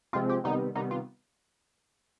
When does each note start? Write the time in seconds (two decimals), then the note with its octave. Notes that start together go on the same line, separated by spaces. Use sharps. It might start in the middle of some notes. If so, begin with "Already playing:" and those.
0.13 C3 F3 G#3 C4 F4
0.29 G4
0.44 C3 D#3 G3 B3 D#4
0.75 C3 D#3 G3 B3 D#4
0.91 F4